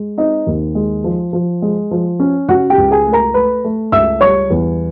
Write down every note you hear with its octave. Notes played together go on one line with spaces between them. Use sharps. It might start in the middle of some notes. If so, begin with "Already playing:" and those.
Already playing: G#3
C4 D#4 D#5
D#2
G#3
F3
F3
G#3
F3
C#4
C#3 F#4 F#5
G4 G5
C#2
G#4 G#5
A3
A#4 A#5
A3 B4 B5
A3
C#2 E5 E6
G3 C#5 C#6
E2